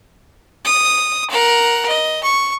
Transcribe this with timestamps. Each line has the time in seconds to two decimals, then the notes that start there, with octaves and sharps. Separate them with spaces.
0.65 D#6
1.30 A#4 F#5
1.88 D#5
2.23 C#6